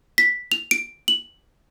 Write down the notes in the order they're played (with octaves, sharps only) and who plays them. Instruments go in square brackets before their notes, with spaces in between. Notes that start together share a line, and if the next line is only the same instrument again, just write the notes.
[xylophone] B6
F7
D7
F#7